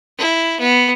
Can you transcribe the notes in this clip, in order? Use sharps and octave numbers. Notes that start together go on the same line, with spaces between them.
E4
B3